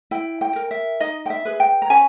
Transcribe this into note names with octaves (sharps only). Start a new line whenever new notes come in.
E4 G5
G5
A#4
E5
D#4 D#5
G5
E5
G#4 B4
G5
A#5
C#4 G#5